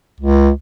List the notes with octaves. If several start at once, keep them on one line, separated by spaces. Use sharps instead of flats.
C#2